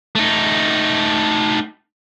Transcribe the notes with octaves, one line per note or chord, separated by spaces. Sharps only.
A3 D#4